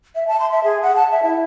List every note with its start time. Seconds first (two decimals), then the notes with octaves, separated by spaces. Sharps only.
0.15 E5
0.28 A5
0.40 C6
0.52 E5
0.64 G#4
0.83 F#5
0.96 A5
1.11 E5
1.23 E4